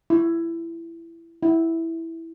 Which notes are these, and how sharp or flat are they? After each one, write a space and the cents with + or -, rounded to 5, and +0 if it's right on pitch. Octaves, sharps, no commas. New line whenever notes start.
E4 +15
E4 -5